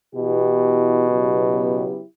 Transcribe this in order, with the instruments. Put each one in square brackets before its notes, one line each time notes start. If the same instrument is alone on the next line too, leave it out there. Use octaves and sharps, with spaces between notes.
[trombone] B2 [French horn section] E3 B3 E4 G4
[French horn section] C#3 F#3 B3 E4 G4